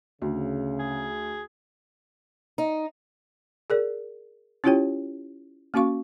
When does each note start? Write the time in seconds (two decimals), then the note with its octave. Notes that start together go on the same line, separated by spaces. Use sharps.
0.22 D2 C#3
0.79 G#4
2.58 D#4
3.70 G#4 A#4 D5
4.64 C#4 E4 F4 G4 C#5 G5
5.74 A#3 C#4 F#4 F5 C#6